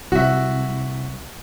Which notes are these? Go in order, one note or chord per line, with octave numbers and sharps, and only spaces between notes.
C2 F#4 E5